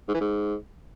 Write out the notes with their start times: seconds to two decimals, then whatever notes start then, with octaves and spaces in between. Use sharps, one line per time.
0.08 G#2
0.15 E3
0.21 G#2